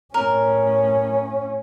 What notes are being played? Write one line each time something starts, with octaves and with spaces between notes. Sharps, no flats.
A2 C#4 A#4